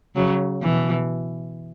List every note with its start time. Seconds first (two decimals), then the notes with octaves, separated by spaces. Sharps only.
0.15 C#3 F#3
0.62 B2 E3